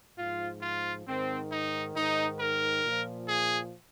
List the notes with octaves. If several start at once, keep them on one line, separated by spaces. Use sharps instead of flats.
G#2 F3 F4
F4
G#2 D#3 C4
D#4
G#2 D#3 D#4
A#4
A#2 F3
G#4